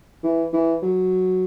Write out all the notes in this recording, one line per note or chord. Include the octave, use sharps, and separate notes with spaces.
E3
E3
F#3